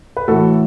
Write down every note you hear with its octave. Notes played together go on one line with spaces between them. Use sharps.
B4
A2 E3 F#4 A4